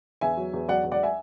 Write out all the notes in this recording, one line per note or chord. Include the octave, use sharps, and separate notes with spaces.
E2 E5 G#5
F#3
E2
F#3 D5 F#5
E2
D5 F#5
E5 G#5